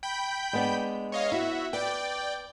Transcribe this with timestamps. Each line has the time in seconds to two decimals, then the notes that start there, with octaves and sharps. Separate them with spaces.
0.03 G5 B5 G6
0.53 G#3 B3 D4
1.12 C#5 D#5 F5
1.32 E4 F#4 E5
1.73 B4 D5 G5